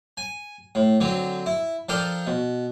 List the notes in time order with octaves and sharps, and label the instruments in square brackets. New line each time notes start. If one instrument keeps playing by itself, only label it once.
[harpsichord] G#5
A2
D3 F#3 C4
E4
F3 D4 A4 A#4 G5
B2